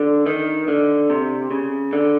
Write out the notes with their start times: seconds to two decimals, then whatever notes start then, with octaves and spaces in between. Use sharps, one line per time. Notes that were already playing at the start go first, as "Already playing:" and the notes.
Already playing: D3
0.26 D#3
0.68 D3
1.10 C3
1.51 C#3
1.93 D3